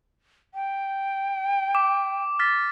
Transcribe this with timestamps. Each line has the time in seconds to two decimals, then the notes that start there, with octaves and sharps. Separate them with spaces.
0.54 G5
1.75 D6
2.39 F6 A6 B6